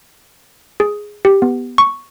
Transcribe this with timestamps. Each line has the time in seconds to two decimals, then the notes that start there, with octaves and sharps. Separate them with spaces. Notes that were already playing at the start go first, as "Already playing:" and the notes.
0.80 G#4
1.25 G4
1.42 B3
1.78 C#6